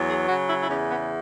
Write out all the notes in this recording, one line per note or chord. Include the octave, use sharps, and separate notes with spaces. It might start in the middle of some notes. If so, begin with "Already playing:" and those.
Already playing: E2 F#3
G#4
C#3 F#4
E4
E4
E2 C#4
B3